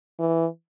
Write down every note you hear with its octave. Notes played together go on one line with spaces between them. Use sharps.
E3